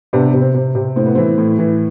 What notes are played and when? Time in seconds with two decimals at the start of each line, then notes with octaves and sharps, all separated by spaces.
0.13 C3 B3 D4
0.34 C3
0.41 C4
0.55 C3
0.75 C3
0.96 A2 C4
1.06 B3
1.15 E3 C4
1.38 A2
1.59 E3